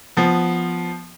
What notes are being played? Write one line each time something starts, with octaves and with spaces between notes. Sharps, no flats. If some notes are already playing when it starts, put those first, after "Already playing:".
F3 B3